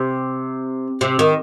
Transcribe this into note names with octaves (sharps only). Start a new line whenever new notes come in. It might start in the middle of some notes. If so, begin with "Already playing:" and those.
Already playing: C3
C3
D#3